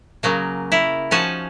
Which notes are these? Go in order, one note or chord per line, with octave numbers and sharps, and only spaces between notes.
C#3 F#3 A#3
E4 A#4
F3 C#4 D#4 F#4 G#5 A5